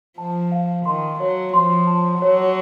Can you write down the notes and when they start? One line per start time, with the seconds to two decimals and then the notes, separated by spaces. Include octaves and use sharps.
0.18 F3 A5
0.52 F5
0.86 D#3 C6
1.20 F#3 C#5
1.54 F3 C6
1.87 A5
2.21 F#3 C#5